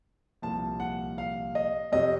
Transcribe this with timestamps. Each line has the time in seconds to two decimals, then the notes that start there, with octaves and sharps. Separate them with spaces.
0.42 C2 A#2 F3 A5
0.80 F#5
1.18 F5
1.55 D#5
1.92 F2 C3 F#3 D#5